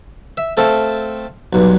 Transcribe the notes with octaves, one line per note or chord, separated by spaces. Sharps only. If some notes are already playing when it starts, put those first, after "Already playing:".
E5
A3 C4 A4 F5
B1 G2